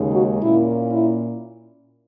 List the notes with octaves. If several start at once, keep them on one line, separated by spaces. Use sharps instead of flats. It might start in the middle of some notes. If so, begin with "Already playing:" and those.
Already playing: D#2 C#3 G#3 D#4
F#4
A#2 A#3 C#4 E4
E4